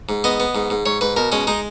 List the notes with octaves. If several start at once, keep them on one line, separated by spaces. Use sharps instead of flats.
G#2
B3 D#5
B3
G#2
G#2
G#2 C#5
G#2 B4
B2 A#4
G#3 C#4
G#3 D#4